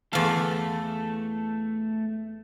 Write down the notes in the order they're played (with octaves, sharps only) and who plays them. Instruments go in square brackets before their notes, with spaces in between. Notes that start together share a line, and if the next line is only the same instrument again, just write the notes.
[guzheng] E2 F5 [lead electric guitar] A3 A4